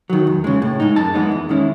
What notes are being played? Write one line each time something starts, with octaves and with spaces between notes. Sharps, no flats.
D#3 F#3
E2
C#3 G#3
A2
G#3 D#4
F#2 A5
E3 G#3 B3 D#4
E2
D#3 G#3 C#4 E4